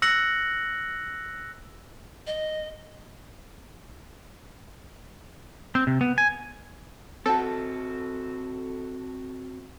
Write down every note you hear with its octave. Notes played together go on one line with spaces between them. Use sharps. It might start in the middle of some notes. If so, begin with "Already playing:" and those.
E6 F#6 A#6 C#7 F#7
D#5
C4
C3
B3
G#5
C4 F#4 A4